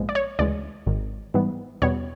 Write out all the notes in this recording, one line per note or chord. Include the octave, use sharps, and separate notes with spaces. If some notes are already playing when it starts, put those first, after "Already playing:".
Already playing: A#1 G#2 F3 G#3 B3
D5
C#5
D2 C#3 E3 G#3 D5
G#1 G#2 D#3
G#2 E3 G3 B3
E2 B2 G3 B3 C#5